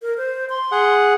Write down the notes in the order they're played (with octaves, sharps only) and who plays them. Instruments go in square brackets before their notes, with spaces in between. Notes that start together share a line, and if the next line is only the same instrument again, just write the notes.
[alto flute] A#4
C5
C6
[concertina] G#4 F#5